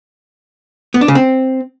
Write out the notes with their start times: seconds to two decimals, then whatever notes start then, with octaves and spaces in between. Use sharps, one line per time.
0.94 B3
1.01 D4
1.08 C#3
1.15 C4